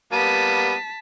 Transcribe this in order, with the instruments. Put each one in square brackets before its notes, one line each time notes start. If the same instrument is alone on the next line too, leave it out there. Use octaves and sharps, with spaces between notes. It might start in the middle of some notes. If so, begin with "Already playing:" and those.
[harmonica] G3 A#3 B3 [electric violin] A5 B6 [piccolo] D#7